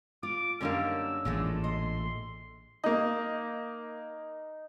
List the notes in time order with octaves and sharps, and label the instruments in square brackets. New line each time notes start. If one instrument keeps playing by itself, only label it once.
[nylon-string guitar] F4 [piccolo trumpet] D6
[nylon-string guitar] F#2 C#4 D#4 [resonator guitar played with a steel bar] D3 G3 A#3 [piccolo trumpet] E6
[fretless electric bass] A1 A#2 [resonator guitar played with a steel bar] D3 G#3 A3
[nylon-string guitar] D#5 [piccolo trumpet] C6
[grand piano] A#3 D#5 [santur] D#4